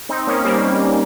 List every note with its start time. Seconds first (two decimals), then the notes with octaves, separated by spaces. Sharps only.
0.09 C4 D#4
0.27 A#3 C#4
0.45 G3 A#3